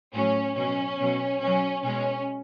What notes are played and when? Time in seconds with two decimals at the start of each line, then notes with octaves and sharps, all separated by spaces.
0.14 A2 F#3 C#4
0.56 B2 F#3 C#4
0.99 B2 F#3
1.41 B2 F#3 C#4
1.83 B2 G#3 C#4